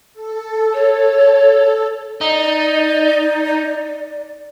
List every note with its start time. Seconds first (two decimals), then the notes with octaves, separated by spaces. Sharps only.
0.13 A4
0.74 C#5
2.21 D#4 D5